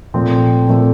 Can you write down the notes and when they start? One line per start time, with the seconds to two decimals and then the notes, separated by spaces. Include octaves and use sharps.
0.14 A#2 F3 A3 C4
0.67 A#2 F3 A3 C4